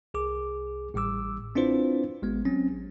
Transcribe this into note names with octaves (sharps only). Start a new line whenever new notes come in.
C2 G#4 D6
A1 A2 G3 D6 E6
C4 D4 E4 F4 B4 C5
G#1 G#3 B3
F#3 C4 C#4
A1